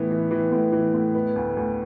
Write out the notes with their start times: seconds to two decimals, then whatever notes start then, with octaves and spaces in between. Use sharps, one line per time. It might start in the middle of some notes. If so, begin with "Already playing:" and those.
Already playing: A2 E3 B3
0.10 E3
0.31 E3
0.52 A2
0.72 E3
0.94 A2
1.15 B3
1.36 D2
1.57 D2